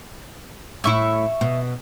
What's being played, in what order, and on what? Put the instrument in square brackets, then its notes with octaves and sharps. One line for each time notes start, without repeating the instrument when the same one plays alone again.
[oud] A2 E4 [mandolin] E5 C#6
[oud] B2